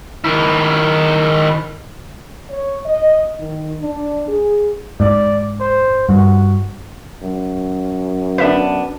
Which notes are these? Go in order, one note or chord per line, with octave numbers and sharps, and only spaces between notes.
D#3 E4
C#5
D#5
D#3
D4
G#4
G#2 D5
C5
G2 F#4
F#2
B3 D4 B4 E5